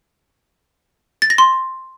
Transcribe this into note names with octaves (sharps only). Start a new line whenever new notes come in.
A6
A#6
C6